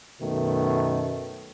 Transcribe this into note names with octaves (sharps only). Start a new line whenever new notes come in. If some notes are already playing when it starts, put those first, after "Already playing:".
F#2 B2 D#3 A3